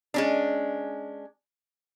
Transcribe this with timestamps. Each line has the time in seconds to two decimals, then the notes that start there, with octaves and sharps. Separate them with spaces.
0.14 G#3 C#4 D4